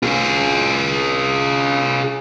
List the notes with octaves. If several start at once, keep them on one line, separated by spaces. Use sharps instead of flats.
F4 G#4